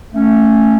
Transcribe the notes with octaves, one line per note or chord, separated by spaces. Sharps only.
A3 C#4